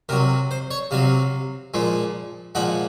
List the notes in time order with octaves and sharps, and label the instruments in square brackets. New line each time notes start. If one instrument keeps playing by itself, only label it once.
[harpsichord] C3 F#3 A#4
C5
C#5
C3 F#3 F5
A#2 F3 G#3
A#2 F3 G#3 F#5